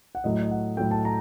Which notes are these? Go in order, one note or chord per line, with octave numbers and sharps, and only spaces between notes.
F#5
A2 F#3 A3 D#5
D#5
F#5
A2 F#3 A3 G5
A5
A#5